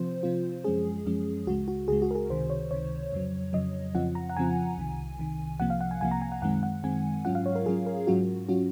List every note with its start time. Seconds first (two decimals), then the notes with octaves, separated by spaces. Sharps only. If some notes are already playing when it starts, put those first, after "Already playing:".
Already playing: C3 F3 C4 F4 C5
0.23 C3 F3 C4 F4
0.64 F#2 F3 G#3 C#4 G#4
1.06 F#2 F3 G#3 C#4
1.47 C#2 C#3 G#3 F#4
1.68 F#4
1.88 C#2 C#3 G#3 G#4
2.02 F#4
2.11 A#4
2.15 G#4
2.29 C#2 C3 D#3 C5
2.50 C#5
2.71 C#2 C3 D#3 C#5
3.12 F2 C#3 F#3
3.53 F2 C#3 F#3 D#5
3.95 F2 C#3 F3 C4 F4 F#5
4.15 A#5
4.29 F#5
4.36 F2 C#3 F3 C4 F4 G#5
4.77 C2 C3 D#3
5.18 C2 C3 D#3
5.60 C2 C3 F3 A#3 F#5
5.70 F5
5.81 F#5
5.91 G#5
6.01 C2 C3 F3 A#3 G#5
6.11 A#5
6.22 G#5
6.32 F#5
6.42 F#2 D#3 G#3 C4 F#5
6.63 F#5
6.84 F#2 D#3 G#3 C4 G#5
7.25 G#2 F#3 C#4 F4 F#5
7.35 F5
7.46 C#5
7.55 A#4
7.66 G#2 F#3 C#4 F4 G#4
7.86 A#4
8.07 G#2 F#3 C#4 F4 F#4
8.48 F#3 C#4 F4 F#4